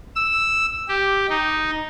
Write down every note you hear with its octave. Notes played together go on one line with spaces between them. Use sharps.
E6
G4
D#4